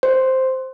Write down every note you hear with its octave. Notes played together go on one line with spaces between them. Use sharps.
C5